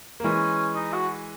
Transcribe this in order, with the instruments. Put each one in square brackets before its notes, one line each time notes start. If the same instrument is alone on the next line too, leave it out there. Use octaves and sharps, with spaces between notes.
[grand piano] A#3
[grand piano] E3 G#3 [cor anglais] C#4
[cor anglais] D#4
F#4